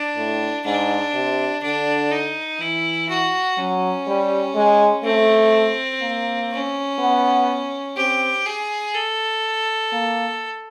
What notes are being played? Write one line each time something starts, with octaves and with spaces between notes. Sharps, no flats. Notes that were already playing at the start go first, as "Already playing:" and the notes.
Already playing: D4
A2
G#2 D4
C3
D3 D4
D#4
E3 E4
F#4
F#3 C#4
G3
G#3
A3 C4
A#3
C#4
B3
C4 G4
G#4
A4
A#3